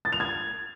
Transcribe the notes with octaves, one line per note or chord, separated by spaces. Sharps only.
A6
F7
G#6